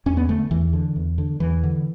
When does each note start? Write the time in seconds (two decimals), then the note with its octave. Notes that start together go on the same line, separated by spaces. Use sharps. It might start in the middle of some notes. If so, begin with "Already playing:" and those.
0.06 E2 C#4
0.17 B3
0.29 D3 A3
0.51 E2 E3
0.73 D3
0.96 E2
1.18 D3
1.40 E2 E3
1.63 D3